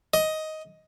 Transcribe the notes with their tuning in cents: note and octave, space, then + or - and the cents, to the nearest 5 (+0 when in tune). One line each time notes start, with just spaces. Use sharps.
D#5 +10